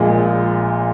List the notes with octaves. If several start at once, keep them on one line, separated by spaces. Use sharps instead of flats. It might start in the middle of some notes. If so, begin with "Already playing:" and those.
Already playing: A#1 A#2 G#3